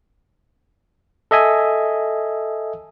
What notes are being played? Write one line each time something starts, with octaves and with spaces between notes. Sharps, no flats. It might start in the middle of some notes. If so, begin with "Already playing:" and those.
A4 D#5 E5 G#5